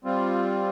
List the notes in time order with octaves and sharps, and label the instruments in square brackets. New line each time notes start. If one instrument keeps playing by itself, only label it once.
[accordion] G3 C4 F4